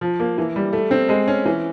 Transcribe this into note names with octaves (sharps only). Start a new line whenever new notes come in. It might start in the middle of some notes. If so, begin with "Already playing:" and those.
F3
A#3
E3
G3
A3
C4
G#3
C#4
E3